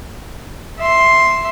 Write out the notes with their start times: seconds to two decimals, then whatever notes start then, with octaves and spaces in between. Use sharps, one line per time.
0.78 E5 C6